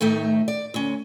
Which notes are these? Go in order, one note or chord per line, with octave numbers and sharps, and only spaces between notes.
A2 D#3 A3 D#4 E5
D5
D2 C#4